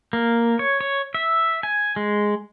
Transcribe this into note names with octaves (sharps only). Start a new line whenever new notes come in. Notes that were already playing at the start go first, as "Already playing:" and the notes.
A#3
C#5
C#5
E5
G#5
G#3